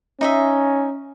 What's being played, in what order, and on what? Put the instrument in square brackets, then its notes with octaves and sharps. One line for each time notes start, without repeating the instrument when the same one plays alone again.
[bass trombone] C#4 [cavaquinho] D#4 D#5 E5